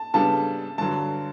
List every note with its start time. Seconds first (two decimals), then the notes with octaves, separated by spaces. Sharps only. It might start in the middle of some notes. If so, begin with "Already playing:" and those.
Already playing: A5
0.14 C#3 G3 B3 D4 A4 A5
0.78 G2 D3 F#3 A5